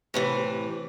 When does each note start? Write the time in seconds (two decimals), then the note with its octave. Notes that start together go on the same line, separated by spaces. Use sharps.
0.14 A2 C3 E3